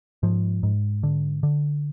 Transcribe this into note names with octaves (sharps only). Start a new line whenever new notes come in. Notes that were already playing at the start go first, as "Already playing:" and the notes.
G#2 F3
G#2
D3
D3